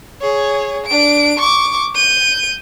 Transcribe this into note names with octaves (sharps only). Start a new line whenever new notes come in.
G#4 C#5
D4 D7
C#6 D6
G6 D#7